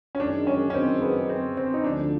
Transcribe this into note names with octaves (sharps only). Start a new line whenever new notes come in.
C#4
F#2 D#3 G#3 D4
C#4
C#4
C4
B3
C4
C4
D#4
D2 D3 F3 D4